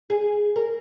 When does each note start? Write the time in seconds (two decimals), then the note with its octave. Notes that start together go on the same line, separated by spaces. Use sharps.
0.10 G#4
0.56 A#4